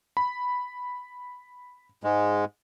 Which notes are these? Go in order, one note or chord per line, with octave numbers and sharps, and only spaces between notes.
B5
G#2 G#3